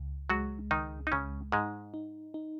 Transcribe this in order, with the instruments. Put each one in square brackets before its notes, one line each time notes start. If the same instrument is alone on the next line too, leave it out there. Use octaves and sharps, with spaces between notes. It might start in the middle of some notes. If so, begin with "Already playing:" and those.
Already playing: [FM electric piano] C#2
[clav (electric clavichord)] F#3 F#4 [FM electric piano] G#3
[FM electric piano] C#2 [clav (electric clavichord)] D#3 D#4
[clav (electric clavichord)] D#4
[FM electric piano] C#2 [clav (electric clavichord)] C#3 C#4
[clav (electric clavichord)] G#2 G#3 [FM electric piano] D#4
[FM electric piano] D#4
D#4